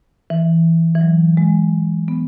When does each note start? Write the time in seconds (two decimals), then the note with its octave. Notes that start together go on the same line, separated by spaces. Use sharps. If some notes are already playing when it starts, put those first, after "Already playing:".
0.30 E3
0.95 E3
1.01 F#3
1.37 G#3
2.08 B3